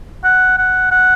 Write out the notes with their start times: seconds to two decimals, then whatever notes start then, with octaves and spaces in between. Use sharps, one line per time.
0.24 F#5
0.58 F#5
0.91 F#5